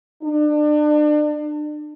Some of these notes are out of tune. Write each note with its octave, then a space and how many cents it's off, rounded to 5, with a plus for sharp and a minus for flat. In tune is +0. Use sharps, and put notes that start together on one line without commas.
D4 +35